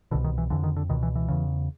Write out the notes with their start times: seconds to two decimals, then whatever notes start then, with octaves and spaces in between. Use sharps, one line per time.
0.11 B2 D3
0.15 C2
0.24 D#3
0.38 E3
0.50 F2 D3 E3
0.64 D#3
0.76 D3
0.89 C#2 B2 D#3
1.03 E3
1.15 E3
1.28 E2 C#3